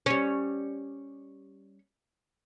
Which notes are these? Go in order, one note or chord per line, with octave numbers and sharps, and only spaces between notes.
G3 C#4